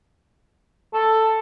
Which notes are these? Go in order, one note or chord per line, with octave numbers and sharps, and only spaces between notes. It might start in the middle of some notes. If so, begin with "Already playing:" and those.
A4